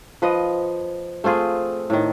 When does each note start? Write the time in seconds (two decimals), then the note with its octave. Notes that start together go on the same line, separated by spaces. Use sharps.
0.22 F3 B4 D#5
1.24 A3 C4 F4 G#4
1.90 A2 D#3